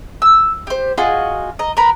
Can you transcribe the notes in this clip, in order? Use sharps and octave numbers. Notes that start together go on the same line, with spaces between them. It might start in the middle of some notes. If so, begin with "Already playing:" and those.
E6
G4 C5
F4 F#4 G#4 D#5
D#5 A#5
A#4 B4 A#5 B5